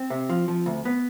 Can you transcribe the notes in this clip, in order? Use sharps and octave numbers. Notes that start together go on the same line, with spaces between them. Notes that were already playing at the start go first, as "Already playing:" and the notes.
Already playing: C4
C3
F3
F3
D2
B3